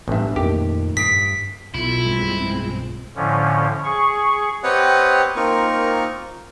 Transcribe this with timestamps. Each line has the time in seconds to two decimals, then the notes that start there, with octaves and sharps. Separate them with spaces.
0.08 A1 G2 B3 D4 E5
0.36 F2 A#2 D#3 A3 G4
0.97 G2 D#6 B6 C7 D7
1.74 B1 B2 E4 F4 A4
2.06 B1 G2 G3 G#3 C4
3.16 A2 D3 F3 C#4
3.84 G#4 C#6
4.63 C4 G4 B4 C#5 D#5 F#5
5.36 A#3 C4 D#4 F4 A#4 C#6